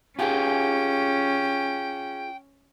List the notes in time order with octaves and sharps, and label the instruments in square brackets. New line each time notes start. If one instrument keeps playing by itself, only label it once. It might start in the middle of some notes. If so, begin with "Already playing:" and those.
[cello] C#4 [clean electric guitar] F4 G4 G#4 [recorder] G5